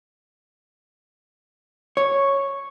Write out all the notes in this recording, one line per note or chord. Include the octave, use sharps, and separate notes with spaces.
C#5